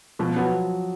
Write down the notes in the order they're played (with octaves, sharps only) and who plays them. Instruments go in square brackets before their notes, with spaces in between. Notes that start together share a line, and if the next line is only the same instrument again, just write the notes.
[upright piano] B2 [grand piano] F3
[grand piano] F#3 [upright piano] B3